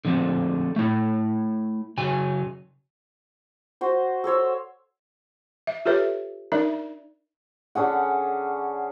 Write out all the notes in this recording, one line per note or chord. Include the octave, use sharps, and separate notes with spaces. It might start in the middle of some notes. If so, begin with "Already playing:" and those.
D3 F3 A3 C4
A3 E4
C#3 F#3 G#5
F#4 C5
A4 C5 C#5 E6
E5
F4 G4 A4 B4 C#5 E5
D4 D#4 A#4 D5 E5
D3 C#4 G#4 F#5